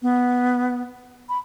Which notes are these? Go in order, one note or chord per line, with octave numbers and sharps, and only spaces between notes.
B3
B5